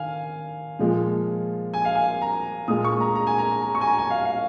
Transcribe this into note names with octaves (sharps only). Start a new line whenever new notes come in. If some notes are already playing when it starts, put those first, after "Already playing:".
Already playing: D#3 F5 G#5
A#2 F3 G#3
G#5
F5
G#5
A#5
A#2 G#3 D#6
C#6
A#5
A#5
G#5
A#5
A#5
C#6
G#5
A#5
G#5
F5
F5